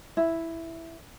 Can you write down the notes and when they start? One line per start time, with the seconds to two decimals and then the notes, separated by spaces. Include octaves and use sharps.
0.17 E4